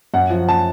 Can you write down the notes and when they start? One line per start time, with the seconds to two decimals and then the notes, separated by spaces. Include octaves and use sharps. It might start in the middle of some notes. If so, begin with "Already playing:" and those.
0.14 F#2 F#5
0.30 F3
0.49 A5